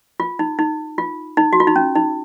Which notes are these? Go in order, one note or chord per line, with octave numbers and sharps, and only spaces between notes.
F4
D#4
D#4
F4
D#4
F#4
F4
D#4
C#4
D#4